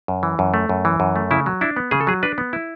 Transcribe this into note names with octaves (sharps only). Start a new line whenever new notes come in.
F#2
E3
F#2
A3
F#2
E3
F#2
A3
C#3 E4
F#3
D4 E4
B3
C#3 G#4
A4
F#3 G#4
D4 B4
B3
E4